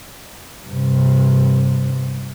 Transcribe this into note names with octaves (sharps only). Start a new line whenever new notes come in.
G2 C3